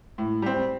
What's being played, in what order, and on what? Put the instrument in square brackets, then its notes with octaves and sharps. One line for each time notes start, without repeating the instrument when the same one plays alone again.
[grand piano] A2
G3 C4